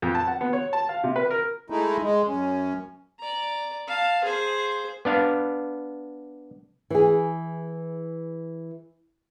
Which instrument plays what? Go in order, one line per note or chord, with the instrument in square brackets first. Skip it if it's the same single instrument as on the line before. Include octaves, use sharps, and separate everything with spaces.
[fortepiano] F2
A5
F#5
B3
C#5
A5
F5
C3
B4
A#4
[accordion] G#3 A3 D#4 E4
G#3
F#2 C#4
[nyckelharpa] D5 A#5
F5 A5
G#4 C5
[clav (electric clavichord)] B3 D4 F5
[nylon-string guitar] E3 G#4